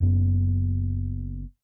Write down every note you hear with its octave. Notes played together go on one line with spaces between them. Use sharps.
F#1 F#2 B3